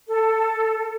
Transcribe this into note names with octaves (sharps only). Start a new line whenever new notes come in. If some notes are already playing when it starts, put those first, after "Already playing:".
A4